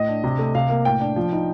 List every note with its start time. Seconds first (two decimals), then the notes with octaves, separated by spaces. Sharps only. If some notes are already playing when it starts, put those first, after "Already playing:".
Already playing: A2 D#5
0.08 D4
0.24 C3
0.39 A3
0.55 C3 F5
0.69 A#3
0.85 A2 G5
1.00 D4
1.16 F3
1.32 D#4